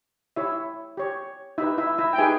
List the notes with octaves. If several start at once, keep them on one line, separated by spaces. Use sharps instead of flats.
E4 G4 C#5 E5
G4 C#5
D#4 E4 G4 B4 E5
E4 E5
E4 E5
G5
D#4 G4 G#4 B4 G#5